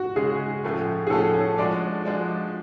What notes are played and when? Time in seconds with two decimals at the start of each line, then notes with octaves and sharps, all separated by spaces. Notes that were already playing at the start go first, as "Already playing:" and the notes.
Already playing: F#4
0.16 C#3 G#3 C#4 G#4
0.64 A2 F3 A3 C#4 F#4
1.07 G#4
1.10 A2 F3 A3 C#4 F#4 A4
1.34 C#5
1.58 F3 G#3 D4 F#4 D5
2.05 F3 G#3 D4 F#4